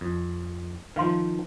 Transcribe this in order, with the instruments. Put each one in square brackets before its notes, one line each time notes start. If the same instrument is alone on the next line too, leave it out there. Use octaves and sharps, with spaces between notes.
[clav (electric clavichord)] F2
[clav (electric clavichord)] D#3 F3 [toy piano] B4 F5 C6